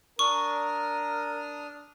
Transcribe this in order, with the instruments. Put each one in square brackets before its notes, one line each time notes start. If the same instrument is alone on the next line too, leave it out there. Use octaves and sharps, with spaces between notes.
[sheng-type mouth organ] D4 D#6 F6 [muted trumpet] A#4 [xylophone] C#6